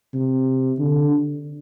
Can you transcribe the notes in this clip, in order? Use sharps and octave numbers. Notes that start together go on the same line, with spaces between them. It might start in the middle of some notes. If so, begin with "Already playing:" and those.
C3
D3